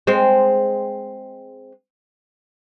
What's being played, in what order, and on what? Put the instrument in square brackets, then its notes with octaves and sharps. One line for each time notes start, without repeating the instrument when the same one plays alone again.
[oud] G#3 C4